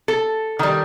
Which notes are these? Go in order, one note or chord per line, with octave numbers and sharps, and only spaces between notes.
A4
D#3 G3